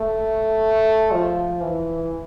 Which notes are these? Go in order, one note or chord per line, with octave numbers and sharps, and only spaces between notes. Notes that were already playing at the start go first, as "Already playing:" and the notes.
Already playing: A3
F3
E3